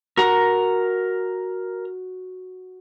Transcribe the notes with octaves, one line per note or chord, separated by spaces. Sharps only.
F#4 A#4 A#5